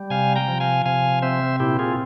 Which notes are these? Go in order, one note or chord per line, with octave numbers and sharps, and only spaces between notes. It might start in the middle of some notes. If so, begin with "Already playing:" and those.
Already playing: G3
C3 F5 G#5
G5 A#5
F3
F5 G#5
C3 F5 G#5
C4 C5 E5
A#2 E4 G4
F4 G#4